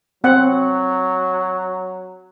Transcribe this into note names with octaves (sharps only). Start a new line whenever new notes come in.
F#3 C4 F#5